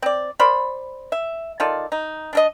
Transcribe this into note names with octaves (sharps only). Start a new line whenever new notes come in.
C4 D5
A#4 C5 D5 B5
E5
D#3 F4 A4 D5
D#4
D4 A4 D#5